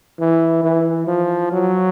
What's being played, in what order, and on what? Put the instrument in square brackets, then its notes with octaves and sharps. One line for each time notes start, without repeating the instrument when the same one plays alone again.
[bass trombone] E3
E3
F3
F#3